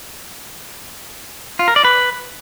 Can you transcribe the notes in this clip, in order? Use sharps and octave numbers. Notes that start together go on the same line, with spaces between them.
F4
A#4
D5
B4